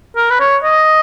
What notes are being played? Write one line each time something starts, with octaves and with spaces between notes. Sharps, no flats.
A#4
B4
C#5
D#5